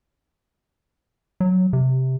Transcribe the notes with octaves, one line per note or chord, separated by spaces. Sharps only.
F#3
C3